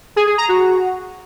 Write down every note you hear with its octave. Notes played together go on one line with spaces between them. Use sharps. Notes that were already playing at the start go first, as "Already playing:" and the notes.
G#4
G#4
A#5
F#4